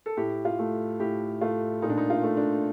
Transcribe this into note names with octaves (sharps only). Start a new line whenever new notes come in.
A4
A2 G4
F4
A3
A2 G4
A3 F4
A#2 D#4
D4
D#4
F4
A3
D4